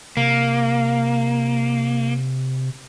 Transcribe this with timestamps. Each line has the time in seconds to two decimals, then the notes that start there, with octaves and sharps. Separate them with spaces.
0.17 C3 A#3